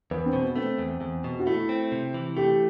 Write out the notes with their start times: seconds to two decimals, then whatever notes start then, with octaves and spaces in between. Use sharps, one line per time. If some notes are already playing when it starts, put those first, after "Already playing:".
0.11 E2 B4
0.26 C4
0.33 B2
0.41 B3
0.55 A3 C4
0.78 E2
1.01 E2
1.24 B2
1.40 F#4
1.46 A3 E4
1.69 C4
1.92 C3
2.14 E3
2.36 A3 G4